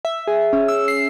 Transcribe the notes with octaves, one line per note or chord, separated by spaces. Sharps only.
E5
G#4
C#4
E6
C7